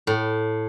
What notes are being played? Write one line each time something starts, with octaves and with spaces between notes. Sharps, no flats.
A2